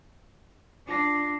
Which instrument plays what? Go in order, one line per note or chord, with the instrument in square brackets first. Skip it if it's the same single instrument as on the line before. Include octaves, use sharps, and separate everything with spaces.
[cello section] D4 [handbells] F4 A#6 C7